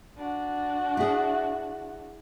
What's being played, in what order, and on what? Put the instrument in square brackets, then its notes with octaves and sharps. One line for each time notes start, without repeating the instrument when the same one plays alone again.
[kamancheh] D4 F#4
[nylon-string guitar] E4 G#4